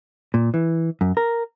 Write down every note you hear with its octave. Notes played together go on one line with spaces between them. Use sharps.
A#2
E3
F#2
A#4